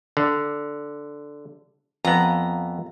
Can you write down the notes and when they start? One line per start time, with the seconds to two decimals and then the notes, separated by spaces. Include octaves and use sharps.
0.17 D3
2.05 F2 B3 A#5